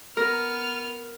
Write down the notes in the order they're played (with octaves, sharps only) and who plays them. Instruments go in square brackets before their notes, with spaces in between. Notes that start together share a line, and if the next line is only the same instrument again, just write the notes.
[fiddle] B3 F6 [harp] A#4